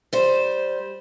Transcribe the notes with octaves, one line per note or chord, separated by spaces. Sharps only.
G3 C5